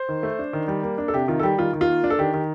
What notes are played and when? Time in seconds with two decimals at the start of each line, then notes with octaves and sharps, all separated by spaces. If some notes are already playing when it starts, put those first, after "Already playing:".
Already playing: C5
0.09 D#3
0.23 A3
0.39 D4
0.53 D#3
0.68 G3
0.83 A#3
0.98 D4
1.08 A4
1.13 C3 G4
1.28 D#3 F4
1.39 A4
1.43 G3 G4
1.58 D#3 F4
1.73 D#3
1.81 F4
1.88 A#3
2.04 D4
2.10 A4
2.19 D#3 G4
2.34 D#3